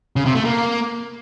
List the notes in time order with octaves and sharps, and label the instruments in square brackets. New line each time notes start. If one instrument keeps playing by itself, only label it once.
[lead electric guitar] C#3
C3
A3
A#3